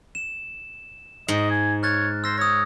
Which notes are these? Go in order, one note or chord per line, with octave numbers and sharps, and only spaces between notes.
E7
G#2 D#5
G#5
C#5 F6 F#6 A6
C5 E6 A#6
C#5 D#6 A#6